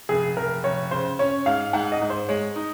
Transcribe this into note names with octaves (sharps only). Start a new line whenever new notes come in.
F1 G#4
F1 A#4
F1 C#5
C#3 C5
C#4 C#5
G#2 F5
G#2 F#5
D#5
G#2
C5
G#3 C#5
D#4